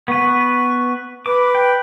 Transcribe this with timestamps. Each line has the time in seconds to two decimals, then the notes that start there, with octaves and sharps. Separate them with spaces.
0.08 B3 B4 C#6
1.26 B4 D6
1.55 G5